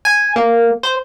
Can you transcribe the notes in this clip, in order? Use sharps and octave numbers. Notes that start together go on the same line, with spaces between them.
G#5
A#3
C5